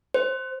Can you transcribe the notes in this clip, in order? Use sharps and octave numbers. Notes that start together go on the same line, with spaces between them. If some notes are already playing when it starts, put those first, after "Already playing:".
C5